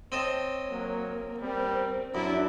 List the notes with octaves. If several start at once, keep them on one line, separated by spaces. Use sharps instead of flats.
C4 C#5 D#5 A5
F#3 A#3
G3 C4 A#4
F#2 D4 E4 F#4